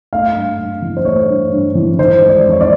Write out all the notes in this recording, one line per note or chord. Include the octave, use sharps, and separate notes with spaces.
A3 F5
G2
G2
E3
C5
A3 C#5
G2
G2
E3
D#3 C5
G#3
D5
F2
C#5
D5